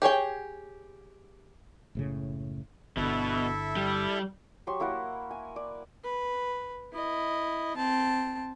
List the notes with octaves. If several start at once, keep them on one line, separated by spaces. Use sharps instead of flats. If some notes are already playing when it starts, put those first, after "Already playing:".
G4 G#4 C#5 G5
F#1 A2 C#3
G1 B2 D3 E4 A4 E5
G3
F#3 G4 C6 C#6
A#3 E4 A#4 F#5
G#5
D5
B4
E4 D#5
C4 A5